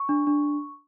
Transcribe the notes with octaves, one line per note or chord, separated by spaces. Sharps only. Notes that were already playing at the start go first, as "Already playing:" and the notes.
Already playing: C#6
D4
D4